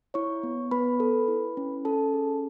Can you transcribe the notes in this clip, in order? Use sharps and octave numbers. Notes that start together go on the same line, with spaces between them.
E4 C#5 C#6
B3
B3 B4 B5
A4
E4
C#4
C#4 A4 A5
G#4